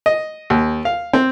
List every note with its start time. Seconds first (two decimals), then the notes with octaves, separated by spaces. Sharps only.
0.06 D#5
0.50 D#2
0.85 F5
1.13 C4